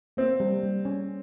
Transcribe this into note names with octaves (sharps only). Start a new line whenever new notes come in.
A#3 C4
G3
G3
C#4